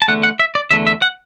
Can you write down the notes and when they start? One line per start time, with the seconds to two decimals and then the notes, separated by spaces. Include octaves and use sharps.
0.02 A5
0.08 E2 D3 A3 F#5
0.23 F#5
0.40 E5
0.55 D5
0.71 E2 D3 A3 E5
0.87 E5
1.02 F#5